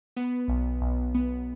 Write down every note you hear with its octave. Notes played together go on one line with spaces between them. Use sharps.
B3
B1
B1
B3